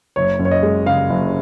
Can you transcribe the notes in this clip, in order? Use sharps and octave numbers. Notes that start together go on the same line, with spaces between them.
F#1 C#5
F#2
C#5
D#5
G#3
C#3 F5
F#1